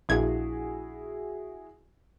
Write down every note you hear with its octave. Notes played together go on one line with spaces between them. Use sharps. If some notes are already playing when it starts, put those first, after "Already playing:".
A#1 E4 F#4 G#4 G#6